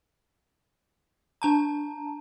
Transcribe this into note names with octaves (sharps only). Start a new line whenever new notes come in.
D4 A5 A#5